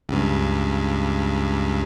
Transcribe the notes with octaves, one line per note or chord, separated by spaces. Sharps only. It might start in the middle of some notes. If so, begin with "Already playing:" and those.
C#2 G2